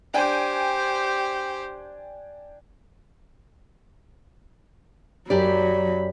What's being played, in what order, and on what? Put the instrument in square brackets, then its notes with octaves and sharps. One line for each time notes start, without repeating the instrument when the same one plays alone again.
[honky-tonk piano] D4 G5 G#5 [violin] G4 C5
[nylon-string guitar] F#2 G4 D5 [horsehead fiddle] F#3 B5